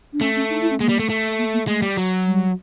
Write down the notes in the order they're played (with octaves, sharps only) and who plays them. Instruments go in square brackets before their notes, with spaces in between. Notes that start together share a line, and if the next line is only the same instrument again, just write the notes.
[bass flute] D4
[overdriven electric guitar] A3 [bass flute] C#4
[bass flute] C#4
D#4
E4
C#4
[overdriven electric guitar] G#3 [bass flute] A#3
[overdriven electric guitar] G3
A3
A3
[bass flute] A#3
A#3
[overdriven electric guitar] G#3 [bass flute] A3
[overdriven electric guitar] G3
F#3
[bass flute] G3